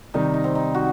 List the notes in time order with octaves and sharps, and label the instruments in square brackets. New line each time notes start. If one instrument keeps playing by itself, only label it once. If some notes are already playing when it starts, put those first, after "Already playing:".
[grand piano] C3 D#3 G3 [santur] D#4
[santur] D#4
C4
D#4
D#4 F#4